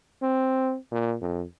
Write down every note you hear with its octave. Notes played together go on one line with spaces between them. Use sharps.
C4
A#2
F2